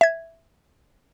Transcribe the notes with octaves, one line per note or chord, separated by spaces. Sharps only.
E5 G#6